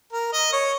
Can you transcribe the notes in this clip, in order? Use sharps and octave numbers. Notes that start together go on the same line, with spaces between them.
A#4
D#5
C#5